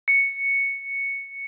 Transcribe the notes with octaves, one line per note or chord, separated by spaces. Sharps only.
C#7